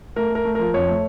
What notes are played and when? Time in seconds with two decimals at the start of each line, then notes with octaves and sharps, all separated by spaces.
0.16 A3 A#4
0.30 A3
0.35 A#4
0.45 A3
0.55 F3 A#4
0.74 F2 C#5
0.88 A3